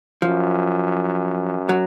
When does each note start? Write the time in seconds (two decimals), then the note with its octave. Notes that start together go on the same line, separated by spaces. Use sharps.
0.22 F#2 F3
1.69 F#3